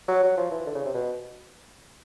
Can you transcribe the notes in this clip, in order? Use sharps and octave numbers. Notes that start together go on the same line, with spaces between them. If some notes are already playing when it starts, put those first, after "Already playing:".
F#3
F#3
F3
E3
D3
C#3
C3
B2